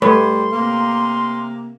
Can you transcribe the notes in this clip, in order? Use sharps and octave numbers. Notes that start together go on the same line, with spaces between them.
G3 A3 B4 C#5 C6
C3 A#3